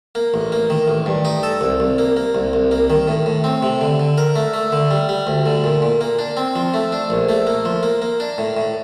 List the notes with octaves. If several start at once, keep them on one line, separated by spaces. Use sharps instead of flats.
A#3
A1
A#3
D#3
A1
G2
D#4
A4
C2
C2
A#3
A#3
C2
C2
A#3
D#3
A2
A2
C4
C3
D3
D3
A#4
A3
A3
D3
G3
G3
D2
D3
A#2
A#2
A#3
D4
C4
F3
A3
D4
A#1
A3
A#3
F3
A#3
A#3
D4
A2
A2